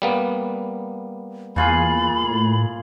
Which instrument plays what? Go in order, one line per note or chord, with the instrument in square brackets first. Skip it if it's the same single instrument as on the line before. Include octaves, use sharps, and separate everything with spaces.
[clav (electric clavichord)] G3 A#3 B3
[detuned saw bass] E2 [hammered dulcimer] A#2 F4 G#4 [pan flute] B5
[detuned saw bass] A2